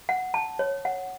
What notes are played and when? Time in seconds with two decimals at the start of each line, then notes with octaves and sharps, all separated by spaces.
0.09 F#5
0.34 A5
0.59 C#5
0.85 F#5